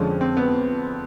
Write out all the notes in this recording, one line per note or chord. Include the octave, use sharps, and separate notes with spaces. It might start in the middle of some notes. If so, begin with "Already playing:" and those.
Already playing: F2 D3 F3 G#3 C#4
C4
B3